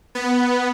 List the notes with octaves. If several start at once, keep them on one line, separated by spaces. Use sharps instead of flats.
B3